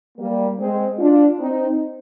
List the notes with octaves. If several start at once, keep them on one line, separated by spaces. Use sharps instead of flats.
G3 A#3
G#3 C4
D4 F4
C4 D#4